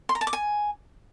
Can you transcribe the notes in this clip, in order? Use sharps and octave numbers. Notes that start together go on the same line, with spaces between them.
C6
A#5
A5
D6
G#5